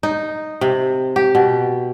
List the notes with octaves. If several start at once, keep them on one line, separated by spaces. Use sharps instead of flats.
D#4
C3
G4
B2